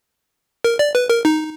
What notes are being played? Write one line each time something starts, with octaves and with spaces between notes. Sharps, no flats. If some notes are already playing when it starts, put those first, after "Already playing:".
A#4
D5
B4
A#4
D#4